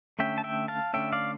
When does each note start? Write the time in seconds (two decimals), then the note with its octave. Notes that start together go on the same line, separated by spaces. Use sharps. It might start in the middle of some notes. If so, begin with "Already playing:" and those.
0.19 D3 A3 C#4 E5 G5
0.38 A5
0.44 E5 G5
0.68 F5 A5
0.93 D3 A3 C#4 E5 G5
1.13 D5 F5